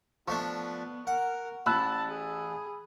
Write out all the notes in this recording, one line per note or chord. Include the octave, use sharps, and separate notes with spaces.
F3 A3 B3 D4 C#6
A#4 F#5
A1 A5 B5 E6 F#6
G#4